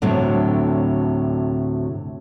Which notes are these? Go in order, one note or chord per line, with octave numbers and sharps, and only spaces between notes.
D2 A2 C3 F#3 D4